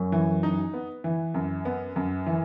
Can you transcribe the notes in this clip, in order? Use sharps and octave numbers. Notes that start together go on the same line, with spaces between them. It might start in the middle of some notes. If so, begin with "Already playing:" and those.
Already playing: F#2
E3
D#4
B3
E3
F#2
B3
F#2
E3